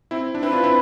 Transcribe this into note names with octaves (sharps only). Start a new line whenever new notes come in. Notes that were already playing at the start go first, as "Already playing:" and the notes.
C4 E4
D4
C4 E4 B4
D4 F4
C4 E4